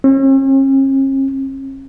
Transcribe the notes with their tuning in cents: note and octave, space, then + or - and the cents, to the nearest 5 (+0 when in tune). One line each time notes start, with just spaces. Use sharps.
C#4 -45